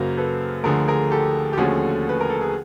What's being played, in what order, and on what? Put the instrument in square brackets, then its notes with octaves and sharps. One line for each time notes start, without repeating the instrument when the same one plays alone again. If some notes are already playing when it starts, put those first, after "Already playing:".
Already playing: [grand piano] F#2 C#3 F#3 A#3 A#4 C5
A4 B4
D2 D3 F3 A3 G#4 A#4
G#4 A#4
G4 A4
G4
D#2 D3 F3 A3 C#4 F#4 G#4
B4
A#4
A4
G#4